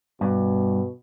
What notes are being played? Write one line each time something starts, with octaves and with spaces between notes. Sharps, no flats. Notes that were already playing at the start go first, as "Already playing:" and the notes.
G2 B2